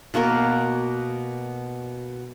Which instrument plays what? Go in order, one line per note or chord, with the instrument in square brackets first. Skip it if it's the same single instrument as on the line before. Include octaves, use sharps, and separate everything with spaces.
[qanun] B2 A#3 F#4 A#4